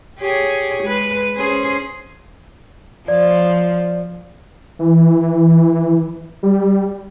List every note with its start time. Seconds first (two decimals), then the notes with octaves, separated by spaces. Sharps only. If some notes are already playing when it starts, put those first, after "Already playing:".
0.19 G4 G#4 C#5
0.83 G#3 B4
1.36 C#4 G#4 C5
3.08 F3 D5
4.79 E3
6.43 G3